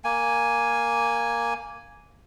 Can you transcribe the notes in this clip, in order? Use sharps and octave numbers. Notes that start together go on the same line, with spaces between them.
A#3 G#5